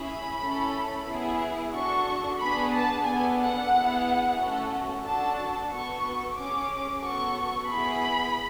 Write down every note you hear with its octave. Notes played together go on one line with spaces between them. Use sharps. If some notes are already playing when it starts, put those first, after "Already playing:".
Already playing: C#4 E4 G#4 B5
A3 C#4 E4 A4
B3 E4 G#4
D4 F#4 A4 C#6
B3 D4 G#4 B5
A5
B3 D4 A4 G#5
F#5
B3 E4 G#4
A3 C#4 F#4 A4
D4 F#4 A4 A5
B3 F#4 A4 C#6
C#4 G#4 D6
B3 F#4 A4 C#6
B3 E4 G#4 B5